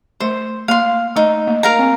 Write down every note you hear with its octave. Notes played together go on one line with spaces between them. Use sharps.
A3 C5
A#3 F5 C6
A3 D#4
A#3
A#4 F5 A#5
C4